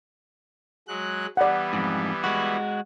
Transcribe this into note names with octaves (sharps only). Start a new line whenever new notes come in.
F#3 G#3 F#6
E3 G3 B3 D5 F#5
F2 G#2
G#3 F#4